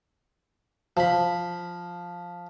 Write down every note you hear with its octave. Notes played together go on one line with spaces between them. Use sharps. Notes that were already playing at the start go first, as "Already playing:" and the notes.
F3 B5